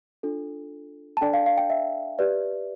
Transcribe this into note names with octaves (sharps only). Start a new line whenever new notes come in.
D4 F4 A4
A5
D4 A4 D5 G5
F5
F5
G5
E5
G4 B4 D5